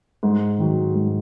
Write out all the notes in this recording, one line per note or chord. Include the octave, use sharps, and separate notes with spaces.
G#2
D#3 F#3
G#2